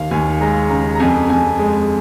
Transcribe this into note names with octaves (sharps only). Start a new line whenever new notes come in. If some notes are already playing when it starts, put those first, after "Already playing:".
Already playing: D#2 F5
D#2 G#5
G#3 A#5
C#3 A#5
A#5
F2 G#5
F2 G#5
G#3